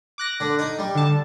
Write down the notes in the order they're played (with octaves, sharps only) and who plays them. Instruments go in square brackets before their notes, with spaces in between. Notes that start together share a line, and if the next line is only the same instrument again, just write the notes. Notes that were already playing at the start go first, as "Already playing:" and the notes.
[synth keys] D6 F#6 A#6
[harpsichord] D3
D#4
G3
[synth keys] D3 A5